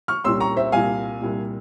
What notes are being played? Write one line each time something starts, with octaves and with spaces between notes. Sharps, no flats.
C#6 F6
C2 A#2 G3 C#4 C6 E6
A#5 C#6
C5 E5
C2 A#2 G3 F5 G#5
C2 A#2 G3